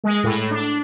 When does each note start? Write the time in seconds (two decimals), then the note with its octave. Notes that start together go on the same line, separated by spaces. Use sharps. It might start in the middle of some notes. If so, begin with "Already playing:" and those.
0.04 G#3
0.24 A2
0.51 D4